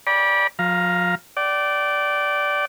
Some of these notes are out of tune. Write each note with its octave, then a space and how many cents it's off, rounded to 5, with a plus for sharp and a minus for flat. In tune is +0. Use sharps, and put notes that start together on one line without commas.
D5 +0 G5 +20 B5 -30
F3 +40 F5 +0 A#5 +10
D5 -5 G5 -40